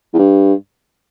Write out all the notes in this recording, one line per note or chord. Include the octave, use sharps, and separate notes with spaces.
E2
G2